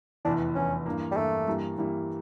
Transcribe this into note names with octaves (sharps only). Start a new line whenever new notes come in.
F1 E2 E3 D4
F1 E2 E3 C#4
G2 E3 A#3
G3
G2 E3 A3 A#3
G2 E3 G3 A#3 E4
G2 E3 G3 A#3 E4